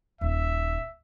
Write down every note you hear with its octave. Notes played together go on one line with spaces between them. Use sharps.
D#1 E5